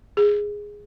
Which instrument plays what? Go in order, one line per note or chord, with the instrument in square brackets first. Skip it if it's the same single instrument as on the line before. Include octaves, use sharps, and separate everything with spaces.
[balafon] G#4